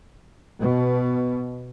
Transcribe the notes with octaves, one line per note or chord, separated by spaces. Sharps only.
B2